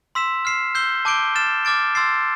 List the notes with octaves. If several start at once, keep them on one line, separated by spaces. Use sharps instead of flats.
C6 E6 B6 E7
F6 C7 E7
E6 G6 C7 G7
A5 D6 G6 D7 G7
F6 A6 E7
D6 F6 A6 D7
C6 E6 A6 C7